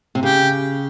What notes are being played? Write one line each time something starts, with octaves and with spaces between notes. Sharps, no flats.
C3
C#3 G4